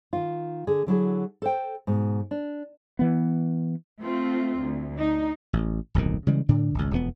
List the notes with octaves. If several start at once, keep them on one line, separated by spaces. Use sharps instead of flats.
D#3 F4
D3 G#4
D3 F#3 E4 G#4
A4 C5 G5
G#2 B2
D4
E3 B3
A3 C4 F4
D2
D4 D#4
A1
D1 B1 F2 D#3
C#3 E3 G3 G#3
A2 D3 D4
G#1 C#2
E1 F2 C#3 B3